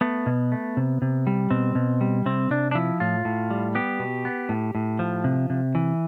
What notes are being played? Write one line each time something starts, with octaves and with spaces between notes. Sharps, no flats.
A3 B3
B2
A3
C3
C3
G3
B2 C4
B2
G3
C3 C4
C3 D4
D4
F3 E4
A2 F4
A2
G3
B3 G4
B2
B3
A2
A2
F3
C3
C3
E3